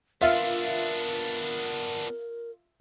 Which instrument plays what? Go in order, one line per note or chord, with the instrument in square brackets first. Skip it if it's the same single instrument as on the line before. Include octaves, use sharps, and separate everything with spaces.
[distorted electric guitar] B3 D4 [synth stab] F4 [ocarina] A#4 [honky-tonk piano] E5